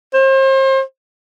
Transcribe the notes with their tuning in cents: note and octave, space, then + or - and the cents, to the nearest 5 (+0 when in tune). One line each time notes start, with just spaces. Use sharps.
C5 +35